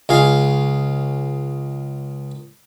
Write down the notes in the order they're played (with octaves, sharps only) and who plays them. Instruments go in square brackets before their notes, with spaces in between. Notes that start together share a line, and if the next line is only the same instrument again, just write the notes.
[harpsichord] C#2 G#4 F5